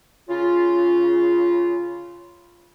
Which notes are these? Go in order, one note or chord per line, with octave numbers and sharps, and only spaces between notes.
C#3 F4